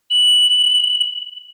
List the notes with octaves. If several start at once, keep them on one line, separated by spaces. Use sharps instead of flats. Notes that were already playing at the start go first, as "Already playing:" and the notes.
F#7